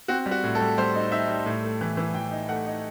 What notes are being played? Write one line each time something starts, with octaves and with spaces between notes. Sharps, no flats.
C4 F#4
G3
F#4
A2
A4
G3
G3 C5
D#4
D#4 E5
G3
A2
A3
E3
E3
E3 G5
D#4
A3 F#5
D#4